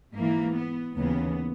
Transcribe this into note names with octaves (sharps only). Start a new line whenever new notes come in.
G#2 E3 A#3
B3
D#2 C#3 E3 B3